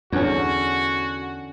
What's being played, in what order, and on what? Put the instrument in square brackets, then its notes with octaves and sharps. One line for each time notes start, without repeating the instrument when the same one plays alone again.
[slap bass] E2 [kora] D3 C#4 [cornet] F#4